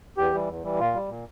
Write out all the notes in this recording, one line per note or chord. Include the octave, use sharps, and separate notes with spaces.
E2 G4
E3 G3
E2
E3 G3
A#2 F4
G3
A#2